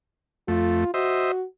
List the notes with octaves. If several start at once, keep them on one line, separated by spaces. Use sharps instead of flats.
F2 A3 F4
F#4 C5 D#5 E5